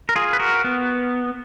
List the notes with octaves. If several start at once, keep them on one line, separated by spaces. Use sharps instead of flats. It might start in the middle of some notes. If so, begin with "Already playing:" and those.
A#4
F4 G#4
B4
F#4 A#4
B3